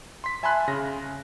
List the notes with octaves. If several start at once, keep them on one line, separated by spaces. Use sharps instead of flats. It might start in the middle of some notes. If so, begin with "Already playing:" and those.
C6 B6
E5 G#5 A5 B5 C6 F#6
C#3 A#6